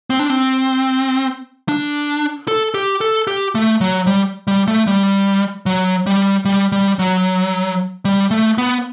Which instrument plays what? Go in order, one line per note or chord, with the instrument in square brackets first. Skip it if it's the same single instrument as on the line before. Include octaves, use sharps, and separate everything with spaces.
[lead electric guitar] C4
D4
C4
D4
A4
G4
A4
G4
A3
F#3
G3
G3
A3
G3
F#3
G3
G3
G3
F#3
G3
A3
B3